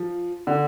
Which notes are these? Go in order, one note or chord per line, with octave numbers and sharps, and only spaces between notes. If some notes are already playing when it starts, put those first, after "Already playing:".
Already playing: F3
D3